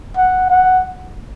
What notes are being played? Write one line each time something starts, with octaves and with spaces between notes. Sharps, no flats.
F#5
F#5